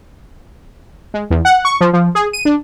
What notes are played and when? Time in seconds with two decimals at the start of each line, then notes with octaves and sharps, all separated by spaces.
1.14 G#3
1.30 E2
1.45 F#5
1.65 C#6
1.81 F3
1.93 F3
2.15 G#4
2.33 D#7
2.45 D4